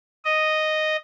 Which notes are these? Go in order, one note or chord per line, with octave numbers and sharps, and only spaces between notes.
D#5